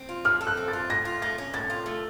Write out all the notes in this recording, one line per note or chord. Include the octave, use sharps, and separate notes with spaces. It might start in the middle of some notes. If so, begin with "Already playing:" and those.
Already playing: C4
F4
F#3 F6
A4
F#6
C4
A6
F4
A2 A#6
F4
A3 A#6
C#4
A2 A6
F4
A3